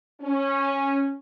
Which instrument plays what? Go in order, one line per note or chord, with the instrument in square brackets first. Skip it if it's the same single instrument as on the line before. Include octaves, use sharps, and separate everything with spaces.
[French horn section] C#4